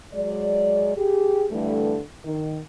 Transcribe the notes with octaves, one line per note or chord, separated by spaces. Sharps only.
F#3 G#3 D5
G4 G#4
G2 D3 E3 G3 A3
D#3